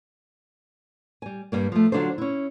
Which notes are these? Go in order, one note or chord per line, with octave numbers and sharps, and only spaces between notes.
G3 G#5
G2 G3 A#3
F3 A3
D3 F#3 D4 F4 A4 C5
C#4 E4